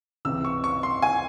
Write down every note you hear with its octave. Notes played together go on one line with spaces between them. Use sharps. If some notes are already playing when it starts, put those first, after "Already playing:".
C#2 C3 E3 E6
C#6
C#6
C6
G#5